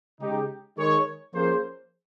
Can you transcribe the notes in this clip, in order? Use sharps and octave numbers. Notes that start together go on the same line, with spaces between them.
C#3 G#3 D#4 G4
D#3 G#3 D#4 A#4 C#5
F3 A#3 C#4 G#4 C5